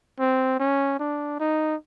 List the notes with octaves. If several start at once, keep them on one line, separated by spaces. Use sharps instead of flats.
C4
C#4
D4
D#4